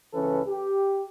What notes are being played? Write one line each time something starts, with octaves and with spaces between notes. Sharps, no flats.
C#2 E3 C#4 A4 B4
G4